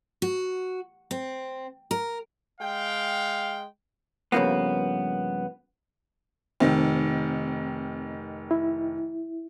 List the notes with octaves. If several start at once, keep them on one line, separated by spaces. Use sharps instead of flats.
F#4
C4
A#4
G#3 F5 G5
G2 C#3 E3 F3 A#3 B3
F1 D#3 C4
E4